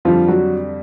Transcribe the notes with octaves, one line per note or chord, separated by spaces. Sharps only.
F2 D3 F3 G3 F4
F#3 F#4